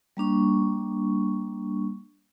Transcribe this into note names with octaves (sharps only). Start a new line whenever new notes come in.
G3 A#3 D4 C#6